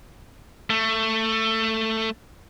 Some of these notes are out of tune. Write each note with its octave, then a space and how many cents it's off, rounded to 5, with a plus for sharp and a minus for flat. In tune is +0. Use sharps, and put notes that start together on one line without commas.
A3 +15